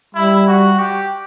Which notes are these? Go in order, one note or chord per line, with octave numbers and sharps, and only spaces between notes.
G3 E4
F#4
G4